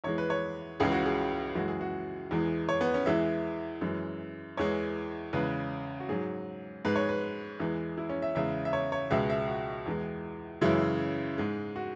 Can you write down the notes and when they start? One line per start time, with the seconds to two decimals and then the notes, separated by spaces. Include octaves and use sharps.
0.04 E2 E3 G#3 C#5
0.18 B4
0.30 C#5
0.80 C#2 C#3 E3 G#3 G#4
0.92 F#4
1.06 G#4
1.55 F#2 E3 G#3 F#4
1.68 G#4
1.81 F#4
2.31 E2 E3 G#3
2.69 C#5
2.81 B3
2.94 C#4
3.06 E2 E3 G#3 E5
3.81 F#2 E3 G#3
4.57 E2 E3 G#3 C#5
5.33 E2 C#3 G#3 B4
6.00 F#4
6.09 G#2 F#3 G#4
6.85 G#2 G#3 B4
6.96 C#5
7.09 B4
7.60 E2 E3 G#3
7.98 E4
8.10 C#4
8.22 E5
8.35 E2 C#3 G#3 E5
8.65 E5
8.73 C#5
8.92 C#5
9.10 C#2 B2 G#3 E5
9.30 E5
9.48 F#4
9.86 E2 E3 G#3
10.61 F#2 C#3 E3 G#3 E4
11.38 G#2 G#3
11.76 F#4